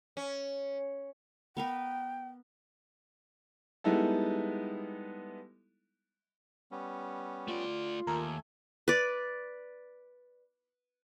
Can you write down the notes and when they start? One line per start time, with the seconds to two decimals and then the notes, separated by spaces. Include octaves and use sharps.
0.17 C#4
1.57 B3 A#4 B4 G5
3.84 G3 G#3 B3 D#4 E4 A4
6.72 G3 B3 C#4
7.48 A3 F4 D5
8.07 D#2 A3 A4 A#4 G#5
8.88 B4 D5